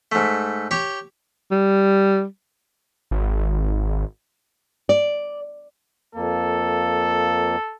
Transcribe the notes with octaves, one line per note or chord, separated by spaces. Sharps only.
G#2 A3
G4 C#5 G5
G3
G#1
D5
F2 A#3 A4